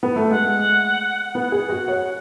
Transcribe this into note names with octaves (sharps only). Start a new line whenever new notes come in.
B3
A3
G#3 F#5
B3 F#5
G#4
F#4
C#5